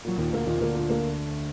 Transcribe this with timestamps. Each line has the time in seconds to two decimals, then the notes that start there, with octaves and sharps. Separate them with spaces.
0.05 A#2 F#3
0.18 D#2 A#2 D#3
0.32 D2 D3 A#3
0.47 D#2 A#2 D#3
0.56 C3
0.61 D2 D3 A#3
0.75 A#2
0.90 A#3